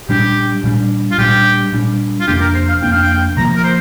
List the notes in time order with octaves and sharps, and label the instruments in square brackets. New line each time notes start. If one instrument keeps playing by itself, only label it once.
[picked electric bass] A#2 G3 D4 [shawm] G4
[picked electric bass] A#2 G3 D4
[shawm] F4
[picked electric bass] A#2 G3 D4 [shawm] G4
[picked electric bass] A#2 G3 D4
[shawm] F4
[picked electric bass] F2 C3 A#3 D4 [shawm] G4
[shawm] A#4
C5
F5
[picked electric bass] F2 C3 A#3 D4 [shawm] G5
[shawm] F5
G5
[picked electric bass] C3 F3 A#3 [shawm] A#5
[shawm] A#4
C5